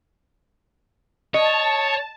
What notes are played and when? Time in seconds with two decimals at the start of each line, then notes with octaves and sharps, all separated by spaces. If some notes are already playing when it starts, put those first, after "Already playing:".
1.34 C#5 D#5 A5